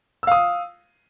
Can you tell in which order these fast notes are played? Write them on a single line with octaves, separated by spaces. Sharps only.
E6 F5 D#6